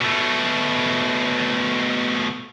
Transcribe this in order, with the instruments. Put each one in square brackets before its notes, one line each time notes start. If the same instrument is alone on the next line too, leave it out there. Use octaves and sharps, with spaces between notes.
[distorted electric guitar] B2 A3